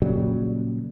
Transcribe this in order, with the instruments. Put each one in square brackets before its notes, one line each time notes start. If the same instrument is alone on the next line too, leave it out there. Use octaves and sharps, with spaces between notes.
[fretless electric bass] A#2 C#3 F#3 G3